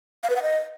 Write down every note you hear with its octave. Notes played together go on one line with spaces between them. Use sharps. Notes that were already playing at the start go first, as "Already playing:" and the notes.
F5
B4
F#5
D#5